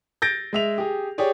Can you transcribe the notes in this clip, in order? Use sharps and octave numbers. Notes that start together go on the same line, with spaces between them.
G6 A6 A#6 D7
G#3 E5 F7
G4 G#4
G4 G#4 C#5 D5